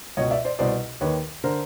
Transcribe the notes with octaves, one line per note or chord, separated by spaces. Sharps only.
C#2 B2 C#5 D#5
D5 E5
C5 D5
C2 B2 C5 D5
D#2 D#3 B4 C#5
D3 A#4 C5